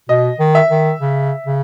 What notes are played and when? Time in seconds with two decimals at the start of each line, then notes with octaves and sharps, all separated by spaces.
0.09 B2 D#5
0.39 D#3
0.55 E5
0.70 D#3
1.00 C#3
1.47 C#3